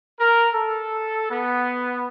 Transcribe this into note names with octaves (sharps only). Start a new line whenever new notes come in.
A#4
A4
B3